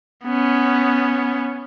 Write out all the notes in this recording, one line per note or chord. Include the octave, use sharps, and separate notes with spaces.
B3 C#4